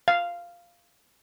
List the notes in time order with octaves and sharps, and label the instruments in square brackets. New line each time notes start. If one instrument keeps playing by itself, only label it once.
[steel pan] F5